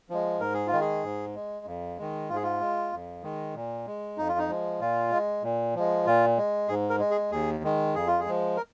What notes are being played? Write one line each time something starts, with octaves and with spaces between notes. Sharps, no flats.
F3 G#3
G#2 A#4
G#4
F4
D#3 G#3
G#4
G#2
G#3
F2
D#3 G#3
G#2 F4
G#4
F4
G#3
F2
D#3 G#3
A#2
G#3
F2 D#4
F4
D#4
F3 G#3
A#2 F4
G#3
A#2
F3 G#3
A#2 F4
G#3
G#2 G#4
A#4
G#3
G#4
D#2 G#4
D#3 G#3
F2 G#4
F4
G#4
F3 G#3
A#4